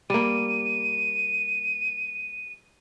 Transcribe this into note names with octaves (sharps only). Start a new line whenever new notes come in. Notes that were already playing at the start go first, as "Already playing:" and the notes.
G3 A#3 D#7